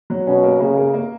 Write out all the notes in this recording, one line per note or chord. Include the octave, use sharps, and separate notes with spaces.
F#3
B2 C#4
A#3
C#3 A#3
A#3
A#3